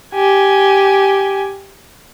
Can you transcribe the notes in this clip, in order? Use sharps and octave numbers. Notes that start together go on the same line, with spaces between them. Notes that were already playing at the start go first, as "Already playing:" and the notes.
G4 G#5